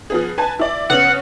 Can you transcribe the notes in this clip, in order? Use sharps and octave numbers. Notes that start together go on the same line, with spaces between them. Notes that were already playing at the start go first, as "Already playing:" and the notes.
F3 B3 G#4
B4 G#5 A5
E4 D5
C#3 B3 C#4 F#5